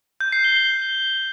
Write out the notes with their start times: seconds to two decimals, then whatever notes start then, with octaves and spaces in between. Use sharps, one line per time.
0.21 G6
0.32 C7
0.44 G7
0.56 G7